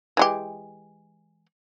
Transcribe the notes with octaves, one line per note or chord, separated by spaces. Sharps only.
E3 G#3 G4